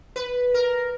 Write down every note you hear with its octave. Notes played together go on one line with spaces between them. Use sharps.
B4
A#4